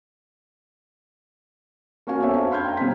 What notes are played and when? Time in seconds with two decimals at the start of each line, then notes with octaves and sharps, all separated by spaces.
2.07 A#3 C#4 F#4 F5 G#5
2.21 B3 C4 A4 C#5 D5 E5
2.34 D4 F#4 C5 F5
2.51 F5 B5 C6 F6 G6 G#6
2.64 G5 A#5
2.77 B2 G3 C4 B6